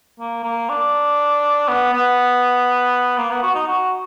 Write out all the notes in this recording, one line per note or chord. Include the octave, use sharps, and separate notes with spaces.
A#3
A#3
D4
B3
B3
A#3
B3
F#4
D#4
F#4